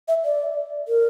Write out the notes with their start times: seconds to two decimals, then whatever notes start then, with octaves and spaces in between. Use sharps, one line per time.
0.08 E5
0.25 D5
0.88 A#4